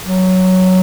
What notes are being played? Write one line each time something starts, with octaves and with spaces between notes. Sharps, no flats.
F#3